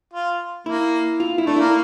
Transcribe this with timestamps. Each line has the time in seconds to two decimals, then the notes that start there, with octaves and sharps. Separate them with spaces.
0.14 F4
0.66 A#3 E4
1.20 F4
1.38 E4
1.46 A3 D4
1.56 A#3 E4